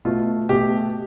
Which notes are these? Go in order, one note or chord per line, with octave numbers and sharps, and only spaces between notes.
B2 A3 F4
B2 A3 G4